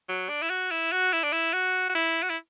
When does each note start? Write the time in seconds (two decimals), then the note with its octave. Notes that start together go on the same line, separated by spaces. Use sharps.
0.09 F#3
0.29 D4
0.42 E4
0.50 F#4
0.71 E4
0.92 F#4
1.13 E4
1.23 D4
1.33 E4
1.53 F#4
1.89 F#4
1.95 E4
2.23 F#4
2.30 E4